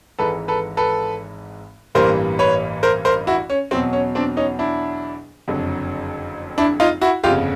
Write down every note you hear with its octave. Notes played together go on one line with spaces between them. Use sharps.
G#1 G#2 E3 G#3 A4 B4
A4 B4
A4 B4
A1 G2 E3 G3 A#3 A#4 C5
B4 C#5
A#4 C5
A#4 C5
E4 F#4
C#4
E2 B2 F#3 C4
C#4
C4 D4
C#4 D#4
D4 E4
F#1 F2 D3 F#3
D4 E4
D#4 F4
E4 F#4
G1 F2 C#3 F4 G4